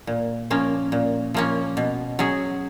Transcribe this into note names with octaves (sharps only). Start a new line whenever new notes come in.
A#2
F3 A#3 C#4
A#2
F3 A#3 C#4
B2
F#3 C#4 G#4